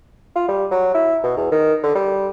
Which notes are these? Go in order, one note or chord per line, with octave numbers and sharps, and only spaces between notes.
F4
G3
F#3
E4
B2
E2
D#3
D3
G3